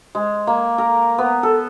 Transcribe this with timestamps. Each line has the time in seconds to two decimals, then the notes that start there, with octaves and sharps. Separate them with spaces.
0.15 G#3
0.47 A#3
0.78 A#4
1.18 B3
1.43 A4